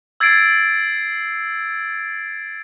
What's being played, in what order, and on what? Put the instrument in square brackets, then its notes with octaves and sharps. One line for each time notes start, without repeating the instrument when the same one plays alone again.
[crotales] E6 G#6 A6 C7 D7